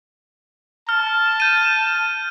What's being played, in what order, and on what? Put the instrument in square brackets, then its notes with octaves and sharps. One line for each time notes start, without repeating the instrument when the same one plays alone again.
[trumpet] A5 [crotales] F6
[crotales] G6 D#7